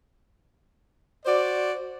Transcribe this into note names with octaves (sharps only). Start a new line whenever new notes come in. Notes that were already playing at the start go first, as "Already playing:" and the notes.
F#4 C5 D5